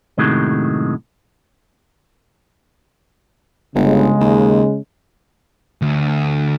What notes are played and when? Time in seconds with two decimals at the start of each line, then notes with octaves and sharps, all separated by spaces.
0.18 F#2 A2 C3 D#3 F#3 G#3
3.75 G1 C#3 G#3
4.20 D#2
5.82 D2